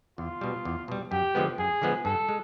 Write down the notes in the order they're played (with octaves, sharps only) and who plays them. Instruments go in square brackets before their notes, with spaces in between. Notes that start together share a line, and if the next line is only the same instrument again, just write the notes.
[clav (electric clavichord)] E2 [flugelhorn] F4
[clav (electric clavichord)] B2 G3
E2
B2 G3
[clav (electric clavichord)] F#2 [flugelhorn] G4
[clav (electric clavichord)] D3 F3 G#3 B3
[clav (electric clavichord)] F#2 [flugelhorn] G#4
[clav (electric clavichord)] D3 F3 G#3 B3
[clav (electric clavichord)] G2 [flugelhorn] A4
[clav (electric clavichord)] G#3